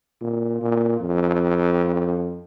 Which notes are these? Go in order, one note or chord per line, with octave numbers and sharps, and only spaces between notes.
A#2
A#2
F2